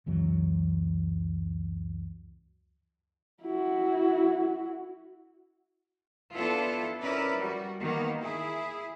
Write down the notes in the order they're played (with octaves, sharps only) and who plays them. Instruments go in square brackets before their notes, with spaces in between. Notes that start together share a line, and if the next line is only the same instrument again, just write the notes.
[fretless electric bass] C#2 F#2 E3 F#3
[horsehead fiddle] E4 F#4
[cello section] B3 D4 E4 F4 A4
C#4 E4 A#4 B4 D5
G3 F#4
D#3 A#3 B3
E4 G#4